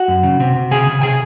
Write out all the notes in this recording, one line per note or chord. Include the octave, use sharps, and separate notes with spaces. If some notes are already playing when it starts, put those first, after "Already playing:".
Already playing: F#4 F#5
F#2
C#3
C3
C3
C#3 G#4 G#5
C#3
C3 G#4 G#5